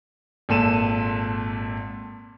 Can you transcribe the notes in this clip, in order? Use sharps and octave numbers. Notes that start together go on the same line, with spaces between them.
G#1 A#2 A4 D#7 E7